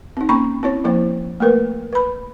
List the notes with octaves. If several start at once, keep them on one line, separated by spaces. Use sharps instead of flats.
C4 D#4
A#3 C#4 A#5 B5 C#6
C4 E4 C#5
F3 A#3 E4 C5
A3 A#3 A#4 B4
B4 B5